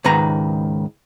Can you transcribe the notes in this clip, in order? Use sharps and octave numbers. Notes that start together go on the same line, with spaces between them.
C#2 G#2 D#3 B4 A#5